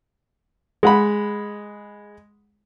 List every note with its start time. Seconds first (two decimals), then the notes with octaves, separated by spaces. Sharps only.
0.83 G#3 F#5 B5